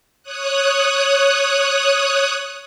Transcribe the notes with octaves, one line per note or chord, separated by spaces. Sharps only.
C#5 D#6 F#6